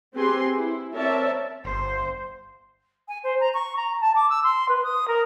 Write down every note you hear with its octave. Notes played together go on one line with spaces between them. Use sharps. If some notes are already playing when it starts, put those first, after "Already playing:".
C4 G4 G#4 B4 G#5 C6
E4
C4 A#4 C#5 D5 E5 A5
G1 C5
G#5
C5
A#5
C#6
A#5
A5
D6
E6
C6
B4
D#6
A#4